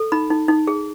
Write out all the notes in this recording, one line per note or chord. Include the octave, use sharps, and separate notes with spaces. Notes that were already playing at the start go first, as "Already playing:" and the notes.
Already playing: A4
D#4 B5
D#4
D#4
G#4